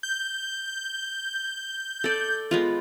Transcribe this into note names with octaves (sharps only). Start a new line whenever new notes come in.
G6
A4 D5
G#3 B3 F4